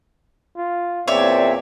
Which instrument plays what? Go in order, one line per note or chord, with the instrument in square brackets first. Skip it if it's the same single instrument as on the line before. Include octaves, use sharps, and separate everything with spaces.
[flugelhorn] F4
[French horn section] E2 A#2 C4 [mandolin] C#5 E5 [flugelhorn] D5